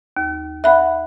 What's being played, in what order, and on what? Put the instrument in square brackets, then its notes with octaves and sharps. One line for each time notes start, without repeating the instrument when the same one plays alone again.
[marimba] D#2
[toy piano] E5 F#5 [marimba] B5 F#6